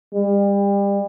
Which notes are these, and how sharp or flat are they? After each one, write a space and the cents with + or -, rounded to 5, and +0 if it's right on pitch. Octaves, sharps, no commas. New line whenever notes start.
G3 +35